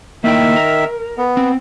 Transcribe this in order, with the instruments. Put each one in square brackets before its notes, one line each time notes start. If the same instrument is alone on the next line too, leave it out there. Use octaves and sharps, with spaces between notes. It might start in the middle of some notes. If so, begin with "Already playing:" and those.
[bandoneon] D#3 E5 [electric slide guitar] A#3 E4 G5
[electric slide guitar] A#4
[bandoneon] B3
[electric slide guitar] C4